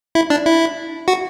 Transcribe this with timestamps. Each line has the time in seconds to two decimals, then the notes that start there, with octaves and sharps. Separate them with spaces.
0.15 E4
0.30 D4
0.46 E4
1.08 F#4